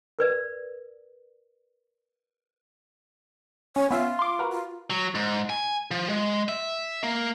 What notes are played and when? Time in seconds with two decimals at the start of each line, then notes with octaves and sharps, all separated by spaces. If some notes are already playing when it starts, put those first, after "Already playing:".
0.19 A#4 B4 D5
3.76 C#4 C#5
3.90 B3 C#4 F4 E5
4.19 C6 D6
4.39 F#4 A#4 B4
4.52 F4
4.90 F#3
5.15 G#2
5.50 G#5
5.91 F3
6.09 G#3
6.49 E5
7.03 A#3